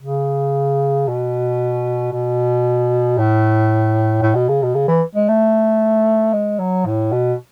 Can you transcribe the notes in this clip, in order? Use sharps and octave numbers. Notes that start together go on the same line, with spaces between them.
C#3
B2
B2
A2
A2
B2
C#3
B2
C#3
E3
G#3
A3
G#3
F#3
A2
B2